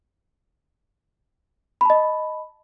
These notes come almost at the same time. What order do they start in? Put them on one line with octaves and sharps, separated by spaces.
B5 A5 D#5